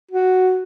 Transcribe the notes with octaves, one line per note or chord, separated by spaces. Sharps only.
F#4